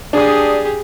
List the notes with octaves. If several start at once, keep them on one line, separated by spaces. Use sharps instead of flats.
D4 G4 G#4 D#6